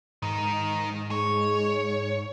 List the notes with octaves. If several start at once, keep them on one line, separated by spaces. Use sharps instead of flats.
G#2 D#3 D#4
G#3 C#5